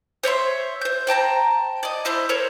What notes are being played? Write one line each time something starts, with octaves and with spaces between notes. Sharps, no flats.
C5 C#5 E5 C6
C5 G6
C5 G5 A5 A#5
D5 D#5
E4 C5 E5
A4 A#4 C5 C#5